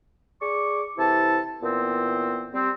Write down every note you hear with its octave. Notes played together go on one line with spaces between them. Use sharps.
G#4 D5 C#6 D6
C3 E3 E4 A4 A5
A#2 E3 B3 C4
G3 C4